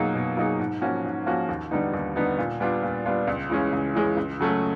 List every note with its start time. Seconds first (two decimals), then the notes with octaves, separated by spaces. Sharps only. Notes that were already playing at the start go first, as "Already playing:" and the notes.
Already playing: B2 F#3 A#3 D#4 G#4
0.15 B2
0.37 F#3 A#3 D#4 G#4
0.59 G#2
0.81 F3 A#3 C#4 F#4
1.04 G#2
1.26 F3 A#3 C#4 F#4
1.49 D#2
1.71 D3 G3 B3 D#4
1.94 D#2
2.16 D3 G3 B3 D#4
2.38 A#2
2.60 G3 B3 D4 F4
2.83 A#2
3.05 G3 B3 D4 F4
3.27 C#2
3.50 C#3 E3 G#3 C#4
3.73 C#2
3.95 C#3 E3 G#3 C#4
4.17 C#2
4.40 C#3 F#3 A3 C#4